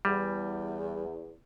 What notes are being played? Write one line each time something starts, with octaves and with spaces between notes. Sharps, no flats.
E2 G3